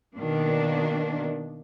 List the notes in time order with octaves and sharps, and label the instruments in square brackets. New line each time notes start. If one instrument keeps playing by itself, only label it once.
[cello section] B2 D#3 A#3 D4